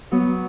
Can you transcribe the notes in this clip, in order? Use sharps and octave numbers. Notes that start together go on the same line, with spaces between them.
F#3 B3